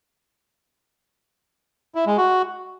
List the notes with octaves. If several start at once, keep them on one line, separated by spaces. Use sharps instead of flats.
E4
G#3
F#4